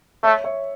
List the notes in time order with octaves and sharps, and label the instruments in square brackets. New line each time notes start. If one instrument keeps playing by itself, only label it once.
[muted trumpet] A3 [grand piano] C#5 E5
[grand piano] C#5 E5